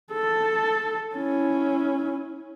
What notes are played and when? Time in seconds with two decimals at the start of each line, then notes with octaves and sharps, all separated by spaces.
0.12 A4 A5
1.16 C#4 E4